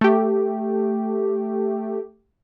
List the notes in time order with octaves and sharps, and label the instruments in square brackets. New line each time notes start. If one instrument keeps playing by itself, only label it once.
[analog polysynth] A3 G4